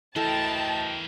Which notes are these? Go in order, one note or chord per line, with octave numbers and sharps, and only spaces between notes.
D2 E3 E4 A4 A#4 D#5 G5 A5